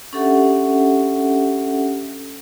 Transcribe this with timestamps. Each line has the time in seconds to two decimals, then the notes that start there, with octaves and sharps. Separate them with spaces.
0.13 C#4 D4 G4 A4 E5 F#5